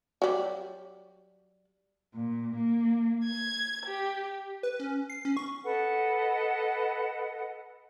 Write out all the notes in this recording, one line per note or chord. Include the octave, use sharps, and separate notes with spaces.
F#3 G3
A#2
A#3
G#6
G4
B4
C#4
C7
C#4
C#6
A4 B4 D#5 F#5